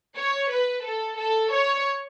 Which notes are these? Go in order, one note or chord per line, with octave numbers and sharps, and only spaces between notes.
C#5
B4
A4
A4
C#5